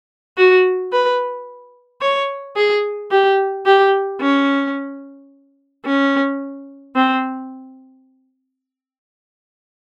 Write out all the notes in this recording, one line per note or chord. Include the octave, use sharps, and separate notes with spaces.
F#4
B4
C#5
G#4
G4
G4
C#4
C#4
C4